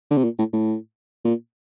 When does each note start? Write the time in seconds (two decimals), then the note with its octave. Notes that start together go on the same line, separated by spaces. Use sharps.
0.11 D3
0.17 C3
0.24 A#2
0.38 A2
0.53 A2
1.24 A#2